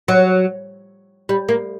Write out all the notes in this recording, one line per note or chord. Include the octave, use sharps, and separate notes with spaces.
F#3
G3
A#3